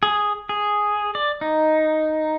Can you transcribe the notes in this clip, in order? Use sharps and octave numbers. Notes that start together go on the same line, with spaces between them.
G#4
G#4
D5
D#4